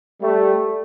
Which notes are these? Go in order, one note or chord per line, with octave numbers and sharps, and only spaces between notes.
G3 A3